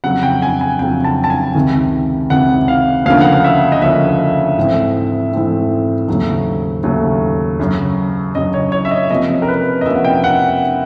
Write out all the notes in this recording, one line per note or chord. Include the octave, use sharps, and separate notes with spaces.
F2 C#3 F#3 F#5
G5
G#5
G#5
F2 C#3 F#3 G5
A5
A5
G#5
C#2 C3 D#3
C#2 C3 D#3 F#5
F5
D2 C#3 F3 A#3 C#4 F5
F#5
F5
E5
D#5
D2 C#3 F3 A#3 C#4 E5
G#2 E3 A3 C4
G#2 E3 A3 C4
D#2 C#3 F#3 A3
D#2 C#3 F#3 A3
F#2 C#3 F#3
F#2 C#3 F#3 D#5
C#5
C#5
E5
D#5
C3 F3 A#3 C#4 D#5
A#4
B4
D#5
C3 F3 A#3 C#4 E5
F#5
G5
F#5